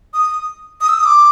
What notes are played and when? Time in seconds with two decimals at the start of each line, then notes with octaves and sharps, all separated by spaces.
0.14 D#6
0.81 D#6
0.89 E6
0.97 D#6
1.05 D6